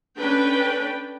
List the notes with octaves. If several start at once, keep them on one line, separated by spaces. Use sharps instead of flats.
C#4 D4 A4 B4 G5